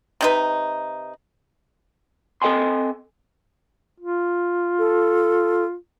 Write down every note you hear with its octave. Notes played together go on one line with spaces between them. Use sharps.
C3 D#4 B4
C4 A4 D#5 G5 G#5 C6
F4
A4